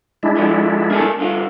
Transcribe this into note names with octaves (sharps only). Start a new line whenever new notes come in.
G#3 D4 E4
D3 F3
A#3 G#4 A4
C2 D3 F4